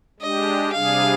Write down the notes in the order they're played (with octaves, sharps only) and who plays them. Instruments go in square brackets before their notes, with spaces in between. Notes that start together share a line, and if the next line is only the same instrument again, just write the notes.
[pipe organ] G#3 D4 G4 [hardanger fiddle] D#5
[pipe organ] C3 G3 D4 G#4 [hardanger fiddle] F5